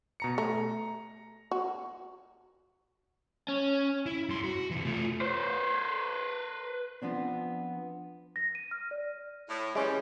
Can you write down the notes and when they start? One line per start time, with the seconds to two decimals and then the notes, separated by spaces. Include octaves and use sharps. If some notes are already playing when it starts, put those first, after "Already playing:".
0.20 B2 A#5 C#7
0.38 A3 A#5
1.51 F#4
3.48 C#4
4.06 E4
4.29 G2 C6
4.44 F#4
4.70 C3 E3
4.85 A3 F4
5.21 B4 C5
7.02 F3 B3 C4 D4
8.36 A#6
8.55 D#7
8.71 F6
8.91 D5
9.49 A2
9.75 E3 G3 G#3 C#4